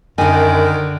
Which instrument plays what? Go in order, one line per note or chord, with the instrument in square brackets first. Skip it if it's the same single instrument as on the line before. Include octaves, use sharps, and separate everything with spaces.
[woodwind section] F#2 [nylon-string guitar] D3 G#5 [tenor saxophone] D#3